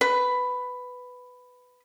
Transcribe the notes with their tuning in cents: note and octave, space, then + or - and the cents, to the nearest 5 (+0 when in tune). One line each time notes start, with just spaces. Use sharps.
B4 +10